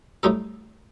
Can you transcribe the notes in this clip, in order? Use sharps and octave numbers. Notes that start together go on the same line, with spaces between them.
A2 G3 D#4 A4